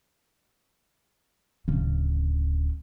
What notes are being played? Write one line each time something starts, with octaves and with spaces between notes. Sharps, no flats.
D1 C#3